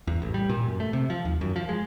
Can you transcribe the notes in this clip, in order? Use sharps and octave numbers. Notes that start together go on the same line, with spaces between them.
E2
A1
G3
A#2
F#2
A3
C3
F3
D#2
F#2
F3
G#3